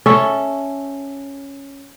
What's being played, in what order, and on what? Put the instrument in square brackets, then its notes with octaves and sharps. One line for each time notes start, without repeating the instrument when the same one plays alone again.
[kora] C#4 A4 E5